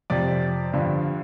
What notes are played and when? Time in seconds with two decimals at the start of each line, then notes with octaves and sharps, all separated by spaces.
0.10 F2 C3 F3 D5
0.73 G2 D3 F3